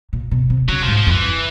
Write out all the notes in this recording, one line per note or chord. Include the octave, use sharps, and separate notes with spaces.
A#2
B2
C3
C#3 F#3
G#2 F3
F3
F2
E3